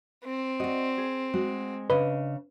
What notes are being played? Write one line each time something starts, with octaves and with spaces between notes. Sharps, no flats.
C4
F#4 D5 D#5
G#4
G#3 F#4
C#3 D4 B4 D#5